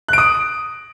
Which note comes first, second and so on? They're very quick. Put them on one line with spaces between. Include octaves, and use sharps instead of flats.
F#6 D7 D#6